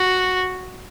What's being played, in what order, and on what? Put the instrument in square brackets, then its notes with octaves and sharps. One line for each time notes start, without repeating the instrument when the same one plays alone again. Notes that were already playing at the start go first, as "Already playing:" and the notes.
Already playing: [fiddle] F#4